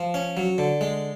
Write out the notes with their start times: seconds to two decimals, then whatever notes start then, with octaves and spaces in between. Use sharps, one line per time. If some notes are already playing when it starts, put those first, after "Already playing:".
Already playing: F3
0.14 C#4
0.37 F#3
0.58 D3
0.81 G#3